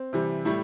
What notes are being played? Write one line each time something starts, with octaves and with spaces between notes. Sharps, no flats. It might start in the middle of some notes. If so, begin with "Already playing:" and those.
Already playing: C4
C3 E3 G3
A2 G3 E4